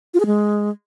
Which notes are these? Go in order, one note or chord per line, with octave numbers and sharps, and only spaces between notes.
F4
G#4
G#3